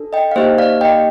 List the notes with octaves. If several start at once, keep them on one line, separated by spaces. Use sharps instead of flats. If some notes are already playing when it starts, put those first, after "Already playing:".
Already playing: D4 A4
D#5 G5
F5
A#3 D#4 G4 C5 D#5
D5 F5
D#5 G5